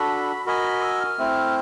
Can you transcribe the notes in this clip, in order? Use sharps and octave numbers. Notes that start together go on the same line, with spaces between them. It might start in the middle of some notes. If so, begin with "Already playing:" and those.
Already playing: D4 F#4 A4 B5
F#4 A#4 D#5 G#5 B5
E6
F6
A3 C4 E4